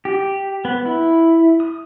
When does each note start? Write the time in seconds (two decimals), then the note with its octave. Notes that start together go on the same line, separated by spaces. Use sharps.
0.05 G4
0.65 B3
0.86 E4
1.60 D#6